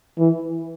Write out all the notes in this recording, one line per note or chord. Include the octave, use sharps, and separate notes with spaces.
E3